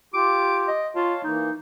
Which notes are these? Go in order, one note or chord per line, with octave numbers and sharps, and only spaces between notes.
F4 G4 D6
D#5
F4 C#5 F5 A5
E3 A#3 D#4